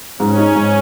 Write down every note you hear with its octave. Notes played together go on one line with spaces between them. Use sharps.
G#2 C#4
D#4
G#2